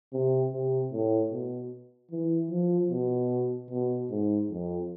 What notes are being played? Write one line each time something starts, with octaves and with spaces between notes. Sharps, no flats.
C3
C3
A2
B2
E3
F3
B2
B2
G#2
F2